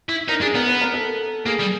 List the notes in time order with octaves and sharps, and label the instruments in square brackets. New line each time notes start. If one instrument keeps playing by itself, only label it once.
[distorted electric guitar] E4
[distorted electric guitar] D#4 [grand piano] A#4
[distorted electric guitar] D4 [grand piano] G#4
[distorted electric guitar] B3 [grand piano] A#4
[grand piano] B4
A#4
A4
[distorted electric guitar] A#3 [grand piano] G#4
[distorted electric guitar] G3